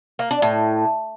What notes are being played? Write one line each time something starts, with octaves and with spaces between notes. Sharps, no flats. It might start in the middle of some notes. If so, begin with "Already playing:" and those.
A#3
D4
A2